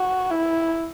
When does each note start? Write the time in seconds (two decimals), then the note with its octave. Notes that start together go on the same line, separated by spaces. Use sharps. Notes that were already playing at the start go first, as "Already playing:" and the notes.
Already playing: F#4
0.30 E4